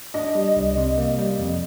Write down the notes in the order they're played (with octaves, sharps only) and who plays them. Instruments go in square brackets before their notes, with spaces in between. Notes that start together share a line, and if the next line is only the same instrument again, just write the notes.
[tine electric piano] D4 [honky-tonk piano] D#5
[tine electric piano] G3
C2
C3
A#3
G3
F2